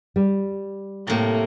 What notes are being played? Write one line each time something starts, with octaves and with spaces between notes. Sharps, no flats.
G3
A2 C3 A#3